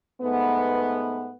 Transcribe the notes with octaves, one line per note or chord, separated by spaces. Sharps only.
G#2 A3 B3